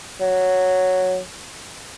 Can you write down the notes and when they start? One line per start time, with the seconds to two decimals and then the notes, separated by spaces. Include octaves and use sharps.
0.21 F#3